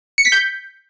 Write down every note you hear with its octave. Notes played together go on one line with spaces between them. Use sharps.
C#7
B6
G6